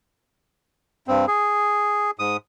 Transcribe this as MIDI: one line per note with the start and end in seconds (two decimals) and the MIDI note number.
1.08 1.26 43
1.08 1.26 60
1.28 2.11 68
2.19 2.37 44
2.19 2.37 87